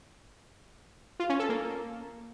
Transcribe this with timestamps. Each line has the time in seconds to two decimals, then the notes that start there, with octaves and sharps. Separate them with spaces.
1.20 F4
1.29 C#4
1.39 A4
1.49 A#3